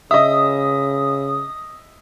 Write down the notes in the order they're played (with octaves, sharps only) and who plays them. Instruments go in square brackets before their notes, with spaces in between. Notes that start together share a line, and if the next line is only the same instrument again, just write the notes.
[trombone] C#3 [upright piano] D#5 E5 [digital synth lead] D#6